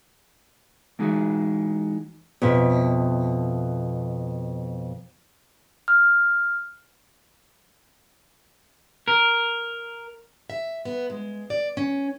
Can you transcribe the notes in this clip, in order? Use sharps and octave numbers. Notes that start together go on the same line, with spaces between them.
E3 G#3 D#4 F#4 G#4
F2 B2 E5
F6
A#4
E5
B3
G#3
D5
C#4